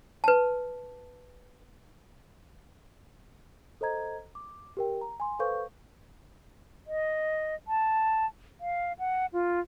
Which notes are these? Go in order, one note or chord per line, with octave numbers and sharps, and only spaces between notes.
B4 A5
A4 C5 D#5 A#5 G#6
D6
G4 A#4 G5
A#5
G#5 C6
A4 B4 C5 F5 C#6 G6
D#5
A5
F5
F#5
F4